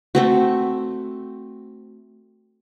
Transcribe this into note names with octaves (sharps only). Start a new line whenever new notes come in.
A3 C4 F#4